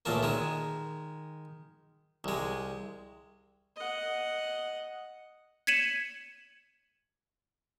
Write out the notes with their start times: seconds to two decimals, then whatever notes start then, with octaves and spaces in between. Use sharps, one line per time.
0.05 C#2 A#2 A3 A#3
0.23 D#3 G#3
2.24 C2 G#3
3.76 D#5 F#5
5.67 G#6 B6 C#7 D#7 E7 F#7